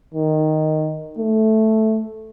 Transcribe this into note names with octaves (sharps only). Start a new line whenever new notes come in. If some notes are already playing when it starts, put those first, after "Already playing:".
D#3
A3